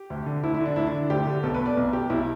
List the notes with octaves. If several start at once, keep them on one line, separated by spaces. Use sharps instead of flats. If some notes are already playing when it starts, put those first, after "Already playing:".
Already playing: G4
D2
D3
D2 E4
E4
D3
D4
D2 E4
D4
D3
D2 G4
D3
B1 A4
B4
B2
D5
B1
B2 G4
B1 E4